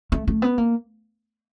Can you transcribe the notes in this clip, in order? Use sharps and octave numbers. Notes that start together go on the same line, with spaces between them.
A3
A3
B3
A#3